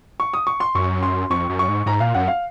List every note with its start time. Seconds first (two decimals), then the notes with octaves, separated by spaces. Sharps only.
0.20 C#6
0.33 D#6
0.47 C#6
0.60 C6
0.75 F#2 C#6
1.03 C6
1.30 F2 C#6
1.50 F#2
1.59 C#6
1.69 G#2
1.86 G#2 A#5
2.00 A#2 F5
2.14 F#2 F#5
2.28 F5